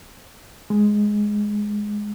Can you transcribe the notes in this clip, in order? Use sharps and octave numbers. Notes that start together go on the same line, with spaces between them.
G#3